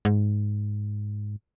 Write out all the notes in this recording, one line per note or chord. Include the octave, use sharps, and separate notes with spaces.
G#2